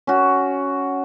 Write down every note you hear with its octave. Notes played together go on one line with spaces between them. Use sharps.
C#4 F#4